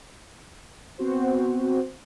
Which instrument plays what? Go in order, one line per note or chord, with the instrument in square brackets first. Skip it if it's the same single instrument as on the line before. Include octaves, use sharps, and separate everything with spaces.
[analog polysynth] B3 C4 F#4 C5